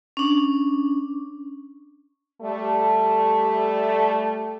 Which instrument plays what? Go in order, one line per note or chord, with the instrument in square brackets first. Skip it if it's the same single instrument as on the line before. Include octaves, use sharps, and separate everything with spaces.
[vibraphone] C#4 D4
[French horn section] G3 A3